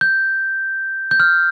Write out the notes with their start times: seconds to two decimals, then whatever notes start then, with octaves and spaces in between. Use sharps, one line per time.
0.01 G6
1.11 G6
1.20 F6